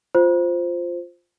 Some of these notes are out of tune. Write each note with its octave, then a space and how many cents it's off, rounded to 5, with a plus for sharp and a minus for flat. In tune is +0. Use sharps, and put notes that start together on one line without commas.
F4 +0 C5 +0